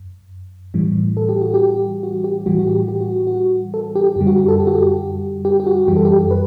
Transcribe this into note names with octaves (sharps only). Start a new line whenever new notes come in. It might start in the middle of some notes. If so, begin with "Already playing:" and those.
Already playing: F#2
A2 E3 G3
A4
G4
F#4
G4
F#4
G4
A2 E3 G3 F#4
F#4
G4
G4
F#4
F#4
A4
G4
F#2 D3 G3 G4
F#4
G4
A4
G4
F#4
G4
G4
G4
F#4
F#2 E3 G3 G4
A4
G4
B4